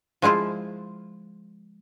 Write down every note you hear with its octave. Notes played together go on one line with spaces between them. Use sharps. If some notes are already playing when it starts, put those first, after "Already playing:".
F3 G#3 E4 F4 C5